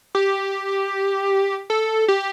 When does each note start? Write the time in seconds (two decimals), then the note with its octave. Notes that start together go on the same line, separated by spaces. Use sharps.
0.15 G4
1.70 A4
2.08 G4